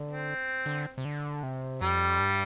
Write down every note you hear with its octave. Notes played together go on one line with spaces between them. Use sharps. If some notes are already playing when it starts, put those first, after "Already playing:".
Already playing: D3
C4
D3
C3
D3
C3
F2 G3
G2